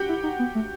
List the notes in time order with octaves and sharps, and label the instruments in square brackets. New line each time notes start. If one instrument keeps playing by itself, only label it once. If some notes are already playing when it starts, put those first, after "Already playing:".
Already playing: [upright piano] F#4 G4 F#5 G5
[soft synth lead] E4
D#4
B3
A3